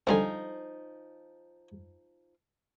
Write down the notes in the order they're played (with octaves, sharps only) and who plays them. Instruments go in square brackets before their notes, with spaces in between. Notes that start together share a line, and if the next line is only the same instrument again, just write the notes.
[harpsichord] D3 G3 C4 [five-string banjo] F3 D#4 G#5